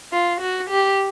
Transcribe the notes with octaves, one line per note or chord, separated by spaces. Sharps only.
F4
F#4
G4